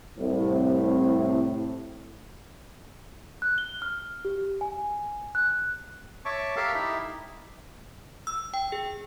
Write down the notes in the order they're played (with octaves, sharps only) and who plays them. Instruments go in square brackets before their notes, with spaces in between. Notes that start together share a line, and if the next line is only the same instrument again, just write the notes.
[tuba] C2 [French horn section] A2 C3
[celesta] F#6
G7
F6
G4
G#5
F#6
[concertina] C#5 E5 A5 C#6 D6
G4 A4 A#4 E5 F5 A5
D#4 E4 G4 E5
[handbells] E6
G5
G#4